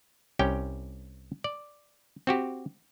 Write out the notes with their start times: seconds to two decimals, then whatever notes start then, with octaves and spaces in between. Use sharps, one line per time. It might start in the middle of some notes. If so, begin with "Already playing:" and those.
0.39 C2 C#4 G4 G5
1.44 D5
2.27 C4 F#4 G4